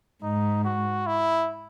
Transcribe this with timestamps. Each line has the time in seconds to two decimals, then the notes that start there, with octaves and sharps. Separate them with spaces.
0.23 G#2 D#4
0.64 F#4
1.07 E4